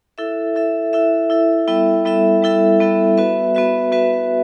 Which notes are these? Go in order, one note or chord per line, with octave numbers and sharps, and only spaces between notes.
E4 A4 E5
E4 A4 E5
E4 A4 E5
E4 A4 E5
G3 B3 E4 A4 E5
G3 B3 E4 A4 E5
G3 B3 E4 A4 E5
G3 B3 E4 A4 E5
B3 F#4 B4 E5
B3 F#4 B4 E5
B3 F#4 B4 E5